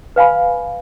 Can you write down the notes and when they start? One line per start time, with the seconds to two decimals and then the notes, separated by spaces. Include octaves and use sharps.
0.16 B4 F5 G#5 B5